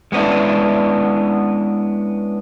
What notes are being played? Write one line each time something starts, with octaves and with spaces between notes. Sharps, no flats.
G#3 B3 C#4 D4 E4